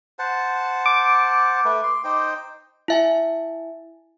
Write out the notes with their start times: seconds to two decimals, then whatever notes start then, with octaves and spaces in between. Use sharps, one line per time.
0.19 C5 F#5 A5
0.86 D6
1.65 A3 B4
1.84 C6
2.04 D#4 C5 G5
2.88 E4 E5 G#5